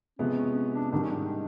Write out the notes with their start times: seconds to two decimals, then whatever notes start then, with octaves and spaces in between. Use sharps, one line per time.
0.19 C3 F3 G#3 B3 C#4
0.37 C#4
0.56 C#4
0.74 D4
0.92 G#2 D#3 G3 D4
1.02 C#4
1.11 D4